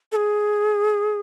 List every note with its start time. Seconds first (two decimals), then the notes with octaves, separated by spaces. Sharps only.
0.12 A4
0.16 G#4